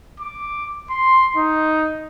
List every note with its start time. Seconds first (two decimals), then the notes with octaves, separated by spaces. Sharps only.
0.20 D6
0.90 C6
1.37 D#4